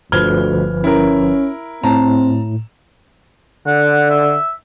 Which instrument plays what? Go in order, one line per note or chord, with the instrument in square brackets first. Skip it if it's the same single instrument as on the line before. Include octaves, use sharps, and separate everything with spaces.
[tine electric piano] G1 F3 B4 [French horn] D2 [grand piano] F6 G#6 G7
[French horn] C#4 [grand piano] E4 A#4
[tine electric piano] A2 [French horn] C4 [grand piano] A5 A#5
[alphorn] D3 [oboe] F#5
[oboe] E5